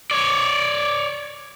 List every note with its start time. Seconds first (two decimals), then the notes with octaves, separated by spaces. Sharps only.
0.11 C#5 D5